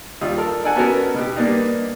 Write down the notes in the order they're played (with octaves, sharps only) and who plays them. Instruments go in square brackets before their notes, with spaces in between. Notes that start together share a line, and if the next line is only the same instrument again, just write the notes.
[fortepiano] D#2 G3 F4 D#6
A4 A#4
D4 A4 D5 F#5 G#5
B3 C#4 F#4 A4 A#4
B2 G4
G3 A#3 B3 D4 D#4